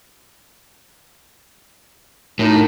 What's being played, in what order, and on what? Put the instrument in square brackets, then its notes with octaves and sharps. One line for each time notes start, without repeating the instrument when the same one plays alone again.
[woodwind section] F#2 D4 D#4 [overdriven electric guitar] A2